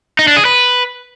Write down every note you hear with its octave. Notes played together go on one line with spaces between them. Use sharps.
D#4
D4
G#4
B4